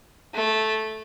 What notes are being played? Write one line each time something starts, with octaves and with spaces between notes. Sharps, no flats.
A3